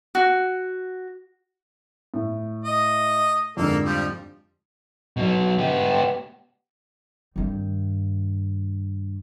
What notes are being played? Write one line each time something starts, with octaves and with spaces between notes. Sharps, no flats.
F#4
A2
D#5
F2 G#2 D3 A#3 A4
F3 G3
B2 F#3
B3 G4
G2 D#3